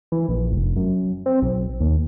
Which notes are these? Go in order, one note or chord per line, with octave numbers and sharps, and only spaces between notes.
E3
A#1
F1
F#2
C4
B1
D#2